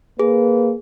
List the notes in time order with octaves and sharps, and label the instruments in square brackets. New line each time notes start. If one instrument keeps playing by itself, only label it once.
[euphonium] A#3 [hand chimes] G#4 [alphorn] B4